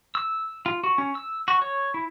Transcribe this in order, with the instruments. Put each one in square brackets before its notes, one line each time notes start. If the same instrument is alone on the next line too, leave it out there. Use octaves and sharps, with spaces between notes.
[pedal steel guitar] E6
F4
F#4
C#4
E6
F#4
C#5
E4